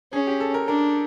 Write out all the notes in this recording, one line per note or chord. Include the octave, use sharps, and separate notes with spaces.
C#4 G#4
G4
A4
A#4
D4 A#4